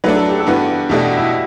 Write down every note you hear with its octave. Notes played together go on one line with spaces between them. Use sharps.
F#3 A3 D4 B4
A4
G4
A4
G2 E3 B3 F#4 B4
E2 B2 A3 D4 G4
F#4
E4